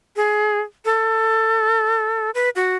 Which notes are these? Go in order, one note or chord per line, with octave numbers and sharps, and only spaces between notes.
G#4
A4
B4
F#4